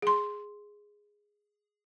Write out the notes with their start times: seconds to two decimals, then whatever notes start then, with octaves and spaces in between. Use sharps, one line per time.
0.02 G#4 C6